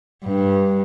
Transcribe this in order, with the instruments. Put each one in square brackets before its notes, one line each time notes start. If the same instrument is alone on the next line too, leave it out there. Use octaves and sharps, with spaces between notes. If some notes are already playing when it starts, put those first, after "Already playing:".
[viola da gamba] G2